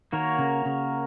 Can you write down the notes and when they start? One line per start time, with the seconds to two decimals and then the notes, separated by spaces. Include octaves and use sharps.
0.12 D#3 A#3 F#4 A#4 C#5
0.39 C#3
0.65 C#3